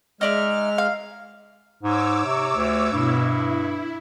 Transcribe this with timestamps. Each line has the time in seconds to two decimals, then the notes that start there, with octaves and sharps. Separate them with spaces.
0.21 G#3 D#4 D5 E5 F6
0.78 F5
1.83 G#2 C#5 D6 E6
2.25 C3
2.56 D2
2.92 G2 B2 E4
3.23 E4